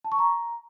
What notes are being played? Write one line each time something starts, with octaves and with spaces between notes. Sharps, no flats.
A5
C#6
A#5